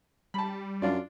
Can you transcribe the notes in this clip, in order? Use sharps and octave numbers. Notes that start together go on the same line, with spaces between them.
G3 A5 B5
F#2 D4 F4 D5